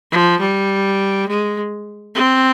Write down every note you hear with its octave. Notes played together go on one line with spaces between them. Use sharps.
F3
G3
G#3
C4